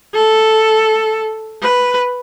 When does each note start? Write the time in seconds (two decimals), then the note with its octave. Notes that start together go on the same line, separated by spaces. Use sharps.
0.15 A4
1.62 B4